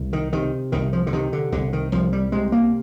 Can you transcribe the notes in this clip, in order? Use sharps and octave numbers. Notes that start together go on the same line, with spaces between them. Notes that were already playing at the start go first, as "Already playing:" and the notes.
Already playing: C2
D#3
C3 D#3
C2 D#3
F3
D3
C3 D#3
D3
C2 D3
D#3
C2 F3
G3
C3 G#3
A#3